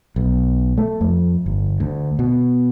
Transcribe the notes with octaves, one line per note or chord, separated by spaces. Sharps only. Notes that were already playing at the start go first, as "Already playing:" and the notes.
B1
A3
F2
G1
D2
B2